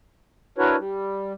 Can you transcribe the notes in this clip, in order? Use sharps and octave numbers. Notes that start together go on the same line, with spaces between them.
D4 E4 F#4 A#4 B4 C#5
G3